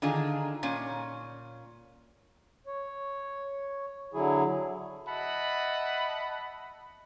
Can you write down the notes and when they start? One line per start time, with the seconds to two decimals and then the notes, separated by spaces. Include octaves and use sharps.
0.02 D3 D#3 D4 D#4 F4 G#4
0.63 A#2 C#4
2.67 C#5
4.14 D3 F#3 E4 G#4
5.08 D#5 E5 F#5 A5 B5